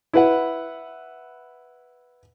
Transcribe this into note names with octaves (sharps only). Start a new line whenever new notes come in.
E4 B4 F#5